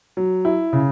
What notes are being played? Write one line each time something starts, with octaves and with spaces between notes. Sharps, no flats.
F#3
E4
C#3